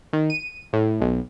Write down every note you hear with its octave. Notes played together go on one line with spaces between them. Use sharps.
D#3
D#7
A2
B1